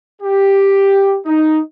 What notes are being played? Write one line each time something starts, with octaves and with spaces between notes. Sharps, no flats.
G4
D#4